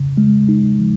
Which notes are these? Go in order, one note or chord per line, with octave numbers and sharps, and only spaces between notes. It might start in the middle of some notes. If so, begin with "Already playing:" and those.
Already playing: C#3
G#3
D#4
F3